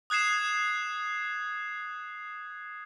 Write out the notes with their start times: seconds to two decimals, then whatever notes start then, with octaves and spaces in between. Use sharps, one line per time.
0.10 D#6 F#6 G#6 C7 E7